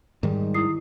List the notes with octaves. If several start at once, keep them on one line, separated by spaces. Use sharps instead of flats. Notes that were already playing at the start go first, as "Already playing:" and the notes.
G#2 D#3 G3
E4 D#6 C7